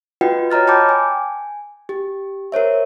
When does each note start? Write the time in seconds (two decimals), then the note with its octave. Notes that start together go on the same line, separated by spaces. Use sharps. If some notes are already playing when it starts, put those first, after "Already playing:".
0.21 F4 F#4 B4 D#5 F#5 G5
0.50 C#5 D#5 A#5 F6 A6
0.68 G5 A5 B5 D6 G6
0.89 G#5
1.89 G4
2.52 A#4 C5 C#5 E5